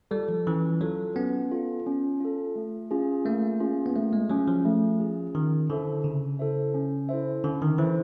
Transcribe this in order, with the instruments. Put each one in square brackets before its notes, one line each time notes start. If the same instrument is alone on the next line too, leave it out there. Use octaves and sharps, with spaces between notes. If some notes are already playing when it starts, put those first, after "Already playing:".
[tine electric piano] G3 [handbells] F4 A4
[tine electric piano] F3
[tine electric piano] E3 [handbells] C#4
[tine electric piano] F#3 [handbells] F4 A4
[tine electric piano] B3 [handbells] C#4
[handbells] F4 A4
C#4
F4 A4
A3
C#4 F4 G#4
[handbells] A3 [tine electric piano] A#3
[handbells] C#4 F4 G#4
[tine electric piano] B3
[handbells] A3 [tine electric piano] A#3
[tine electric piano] G#3
[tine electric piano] F#3 [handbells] C#4 F4 G#4
[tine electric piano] F3
[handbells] A3
C#4 F4 G#4
[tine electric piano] D#3 [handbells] C#4
[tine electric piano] D3 [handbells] E4 A4 C5 E5
[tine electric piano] C#3 [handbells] C#4
[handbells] E4 A4 C5 E5
C#4
E4 A4 C5 E5
[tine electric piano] D3 [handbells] C#4
[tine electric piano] D#3
[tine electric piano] E3 [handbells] E4 A4 C5 E5